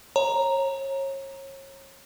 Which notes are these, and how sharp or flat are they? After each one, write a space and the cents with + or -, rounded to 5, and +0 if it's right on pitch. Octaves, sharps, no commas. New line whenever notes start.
C#5 -30 A#5 +0